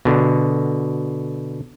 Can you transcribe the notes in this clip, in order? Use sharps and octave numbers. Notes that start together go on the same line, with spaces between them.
B2 D3